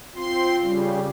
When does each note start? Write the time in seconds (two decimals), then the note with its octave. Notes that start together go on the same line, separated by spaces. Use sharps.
0.16 C4 F4 C6
0.60 C#3 G3